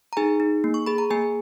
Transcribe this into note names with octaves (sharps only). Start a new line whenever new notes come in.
A#5
D#4 G#4 G#5
D#4
A#3
C#6
G#4 B5
A#5
A#3 G#4 G#5